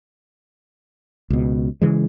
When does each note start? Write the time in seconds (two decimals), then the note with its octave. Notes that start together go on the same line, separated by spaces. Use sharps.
1.30 C#2 B2
1.82 C#3 E3 G#3